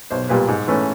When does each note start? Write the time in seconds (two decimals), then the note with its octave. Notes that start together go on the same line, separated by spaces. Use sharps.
0.11 B1 C5
0.29 A#2 G3 B4
0.48 G#2
0.67 E3 A3 C#4